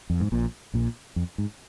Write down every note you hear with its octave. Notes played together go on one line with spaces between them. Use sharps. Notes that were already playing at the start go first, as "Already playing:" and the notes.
F2
G#2
A#1 A#2
A#1 A#2
F2
G#2